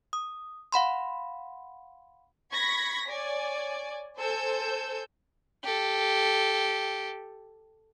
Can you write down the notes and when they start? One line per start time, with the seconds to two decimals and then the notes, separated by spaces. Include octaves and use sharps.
0.13 D#6
0.72 F5 F#5 B5 C6
2.51 B5 C#6 G#6 A#6 B6
3.06 C#5 D5 G#5
4.17 A4 C5 G#5 E6 G6
5.64 G4 A4